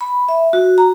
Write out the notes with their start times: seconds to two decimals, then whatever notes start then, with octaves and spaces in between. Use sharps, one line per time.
0.01 B5
0.29 E5
0.53 F#4
0.78 A#5